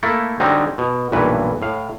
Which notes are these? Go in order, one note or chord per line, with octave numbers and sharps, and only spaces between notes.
A3 A#3 E4 A4
D3 F#3 G3 C4 D#4
B2
B1 G2 A#2 E3 B4
A2 F5